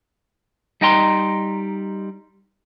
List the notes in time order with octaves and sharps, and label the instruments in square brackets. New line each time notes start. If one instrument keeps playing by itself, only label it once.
[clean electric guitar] G3 D#4 D#5 G5 A#5 C6